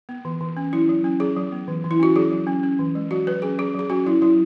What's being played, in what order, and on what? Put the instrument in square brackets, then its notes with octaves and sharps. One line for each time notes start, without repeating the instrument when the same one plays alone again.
[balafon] B3
E3
E3
C#4
F#3 E4
F#3
C#4
F#3 G#4
F#3
B3
E3
E3
E4
C#4 F#4
F#3 G#4
F#3
C#4
C#4
E3
G#3
F#3 F#4
F#3 B4
C#4 G#4
F#3 G#4
F#3 G#4
C#4 F#4
F#3 E4
F#3 E4